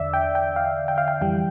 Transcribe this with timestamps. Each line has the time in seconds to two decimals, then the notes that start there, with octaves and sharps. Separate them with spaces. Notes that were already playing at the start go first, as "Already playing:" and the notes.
Already playing: E2 D3 D5 E5
0.14 G5
0.35 G5
0.56 F5
0.88 G5
0.98 F5
1.08 G5
1.21 F2 E3 G3 G5